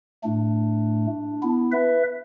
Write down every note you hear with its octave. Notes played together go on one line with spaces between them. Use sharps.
A2 A3 D4
B3 E4
B4 E5